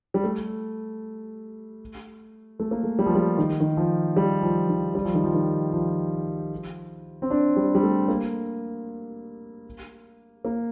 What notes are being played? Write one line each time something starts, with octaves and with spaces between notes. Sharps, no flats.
G3
A3
A3
A#3
A3
G3
F3
G3
D#3
D#3
F3
G3
F3
D#3
G3
F3
D#3
F3
D#3
F3
C4
D4
G3
G3
A3
A#3
A#3